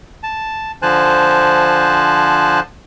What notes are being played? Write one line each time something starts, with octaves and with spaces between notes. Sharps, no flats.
A5
D3 F3 C5 G#5 A5 F#6